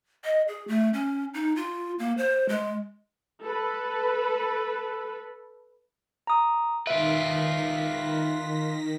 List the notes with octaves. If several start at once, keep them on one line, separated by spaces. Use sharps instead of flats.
D#5
G#4
A3
C#4
D#4
F4
A#3
C5
G#3
A4 B4
A#5 D#6
D#3 F4 B4 E5 A#6 B6 D7